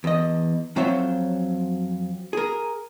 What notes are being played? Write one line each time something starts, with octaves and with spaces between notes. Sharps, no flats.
E2 D#5
F2 F#3 C4 F4 C#5 E5
G#4 A#4